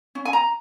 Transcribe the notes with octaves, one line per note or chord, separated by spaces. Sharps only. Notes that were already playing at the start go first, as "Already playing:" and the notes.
C#4
G#5
A#5